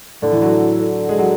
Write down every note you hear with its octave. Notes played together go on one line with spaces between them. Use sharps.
A2 D3 A3
E3 E4
F#3 F#4
D3
G#3 G#4
F#3 F#4